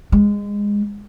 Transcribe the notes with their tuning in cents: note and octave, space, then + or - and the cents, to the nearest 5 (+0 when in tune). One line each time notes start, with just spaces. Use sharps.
G#3 -20